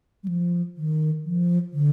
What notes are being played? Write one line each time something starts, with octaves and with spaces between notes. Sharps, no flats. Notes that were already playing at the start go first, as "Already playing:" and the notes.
G3
F3
D#3
F3
D3